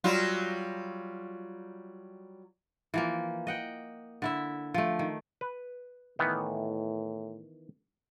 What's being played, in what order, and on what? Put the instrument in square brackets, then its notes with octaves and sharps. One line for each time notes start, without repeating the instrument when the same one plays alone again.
[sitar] F#3 G3 F4
[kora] E3 F3 A#3
D#5 F#5 G5
D3 E4 E5
F3 A3
D#3
[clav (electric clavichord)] B4
[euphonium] A2 [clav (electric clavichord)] D#3 E3 B3